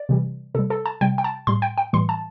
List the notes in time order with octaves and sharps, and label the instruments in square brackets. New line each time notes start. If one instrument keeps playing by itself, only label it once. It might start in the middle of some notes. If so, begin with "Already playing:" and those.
Already playing: [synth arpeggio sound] D5
C3 E3 G3
C3 G3 A4
A4
A5
C3 G3 G5
G5
A5
A2 G3 C6
G5
G5
A2 E3 G3 C6
A5